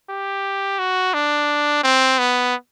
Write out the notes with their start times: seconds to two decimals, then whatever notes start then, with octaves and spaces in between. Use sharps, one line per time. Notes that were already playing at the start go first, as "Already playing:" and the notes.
0.10 G4
0.79 F#4
1.14 D4
1.84 C4
2.19 B3